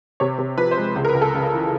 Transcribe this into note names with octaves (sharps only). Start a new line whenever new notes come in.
C3 C#5
C3
F3 B4
C5
G#3
C#2
A#4
B4
C#2
A4
C#3
E3